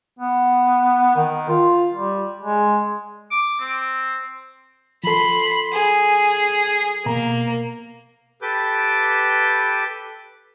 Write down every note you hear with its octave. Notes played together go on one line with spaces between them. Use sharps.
B3
D#3
F4
G3
G#3
D6
C4
F3 A4 B5 C6
G#4
B2 A#3 A#5
G4 A4 B4 D6 G6